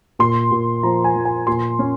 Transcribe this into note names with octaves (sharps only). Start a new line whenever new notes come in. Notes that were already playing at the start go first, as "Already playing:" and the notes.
A#2 C6
A#2
F3 A#5
G#5
F3
G#5
A#2 C6
C#4